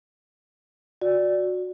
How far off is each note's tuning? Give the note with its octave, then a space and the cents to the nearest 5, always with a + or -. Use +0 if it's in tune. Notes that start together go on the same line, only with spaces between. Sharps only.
F#4 -20 D5 -5